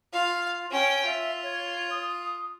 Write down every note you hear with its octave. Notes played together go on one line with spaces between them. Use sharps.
F4 F5
C#4 G5 G#5
F4 E5
C#5
D#6